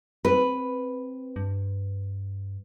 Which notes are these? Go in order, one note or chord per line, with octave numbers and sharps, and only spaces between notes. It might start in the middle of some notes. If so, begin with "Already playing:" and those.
C4 B4
G2